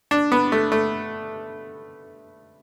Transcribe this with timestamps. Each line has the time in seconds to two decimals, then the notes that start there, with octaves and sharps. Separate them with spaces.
0.11 D4
0.32 B3
0.52 A3
0.72 A3